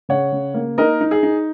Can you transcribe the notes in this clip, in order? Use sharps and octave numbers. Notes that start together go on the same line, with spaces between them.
C#3 C#5 F#5
C#3
A#3
D#4 A#4 D#5
D#4
G#4
D#4